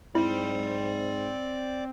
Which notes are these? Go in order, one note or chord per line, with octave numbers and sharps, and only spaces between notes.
G#2 C4 E4 D5 B5